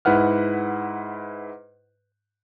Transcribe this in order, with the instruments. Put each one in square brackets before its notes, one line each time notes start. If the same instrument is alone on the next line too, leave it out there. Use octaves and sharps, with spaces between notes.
[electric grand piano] G#2 E4 B4 F#5 F6